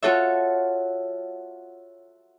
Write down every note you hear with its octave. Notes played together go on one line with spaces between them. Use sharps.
F4 F#4 A4 C#5 E5